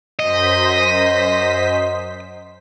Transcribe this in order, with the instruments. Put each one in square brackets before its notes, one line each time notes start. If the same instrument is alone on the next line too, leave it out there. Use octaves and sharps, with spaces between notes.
[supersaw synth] F#2 C5 B6 [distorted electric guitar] D#5